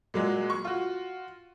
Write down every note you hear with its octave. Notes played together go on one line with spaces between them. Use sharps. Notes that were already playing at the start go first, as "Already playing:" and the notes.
A#2 F#3 G#3
C#6
F4 F#4